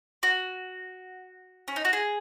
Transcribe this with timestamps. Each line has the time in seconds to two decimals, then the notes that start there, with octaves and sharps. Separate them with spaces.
0.23 F#4
1.68 C#4
1.76 D#4
1.85 F#4
1.93 G#4